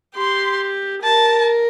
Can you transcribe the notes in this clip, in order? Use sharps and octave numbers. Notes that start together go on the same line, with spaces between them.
G4 C6
A#4 A5